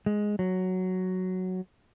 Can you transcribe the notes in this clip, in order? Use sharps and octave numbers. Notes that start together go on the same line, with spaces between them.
G#3
F#3